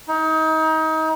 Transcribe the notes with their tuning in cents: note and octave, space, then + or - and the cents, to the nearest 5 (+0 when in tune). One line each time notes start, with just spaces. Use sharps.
D#4 +30